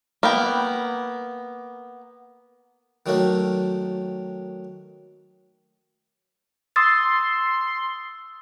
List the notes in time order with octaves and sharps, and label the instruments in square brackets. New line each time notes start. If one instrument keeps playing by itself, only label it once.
[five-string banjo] A#3 B3 G5
[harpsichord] D#3 F#3 A3 A#3 D4
[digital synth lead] C6 [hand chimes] D#6 E6 A6